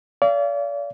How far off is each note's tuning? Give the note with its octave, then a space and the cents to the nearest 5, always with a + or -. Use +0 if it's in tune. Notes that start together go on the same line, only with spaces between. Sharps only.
D5 -40 F5 -30